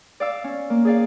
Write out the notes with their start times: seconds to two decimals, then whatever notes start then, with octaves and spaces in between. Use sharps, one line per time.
0.20 D5 F5 E6
0.44 C#4
0.70 A#3
0.85 G#4 D5 F5